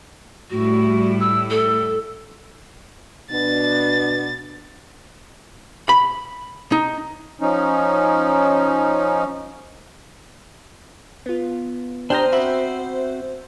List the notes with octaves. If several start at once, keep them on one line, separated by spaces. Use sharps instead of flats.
A2 G3 E4 F#4
E6
A4
B2 B3 D4 A6
B5
D#4
F3 C#4 D#4
B3 F4
D4 G4 C5 G5 A#5 D#6 F6
C4 F#4 E5 B5